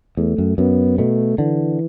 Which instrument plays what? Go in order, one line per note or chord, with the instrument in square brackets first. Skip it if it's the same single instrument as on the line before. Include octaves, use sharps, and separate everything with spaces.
[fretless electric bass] E2 [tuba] A3
[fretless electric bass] F#2
[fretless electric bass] F#2 [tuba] B3
[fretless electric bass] B2 [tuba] A3
[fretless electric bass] D3 [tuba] E3